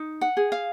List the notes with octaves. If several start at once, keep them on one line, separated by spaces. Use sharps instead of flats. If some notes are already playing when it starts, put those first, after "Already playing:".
Already playing: D#4
F#5
G#4
F5